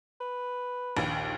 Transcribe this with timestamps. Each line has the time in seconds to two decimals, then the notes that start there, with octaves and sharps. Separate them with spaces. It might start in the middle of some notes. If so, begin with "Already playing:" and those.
0.20 B4
0.97 A#1 D#2